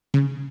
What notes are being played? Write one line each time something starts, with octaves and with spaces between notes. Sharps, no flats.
C#3